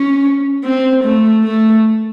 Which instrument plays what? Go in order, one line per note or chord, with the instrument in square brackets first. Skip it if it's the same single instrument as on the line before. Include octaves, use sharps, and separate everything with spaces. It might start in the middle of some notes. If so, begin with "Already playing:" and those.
Already playing: [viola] C#4
C4
A3
A3